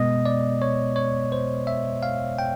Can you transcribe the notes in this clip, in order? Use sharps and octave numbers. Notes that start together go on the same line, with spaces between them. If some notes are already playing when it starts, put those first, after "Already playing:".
Already playing: B2 G#3 B3 D#5
D5
C#5
C#5
C5
E5
F5
G5